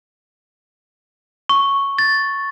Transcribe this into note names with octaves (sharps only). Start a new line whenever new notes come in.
C#6
A6